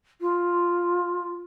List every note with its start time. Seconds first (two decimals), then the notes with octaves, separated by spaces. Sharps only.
0.21 F4